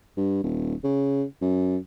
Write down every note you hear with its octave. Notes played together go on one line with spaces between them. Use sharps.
G2
D#1
C#3
F#2